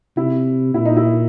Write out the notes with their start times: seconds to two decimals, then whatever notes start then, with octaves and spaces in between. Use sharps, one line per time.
0.17 C3 E4
0.74 A#2 E4
0.85 D#4
0.97 E4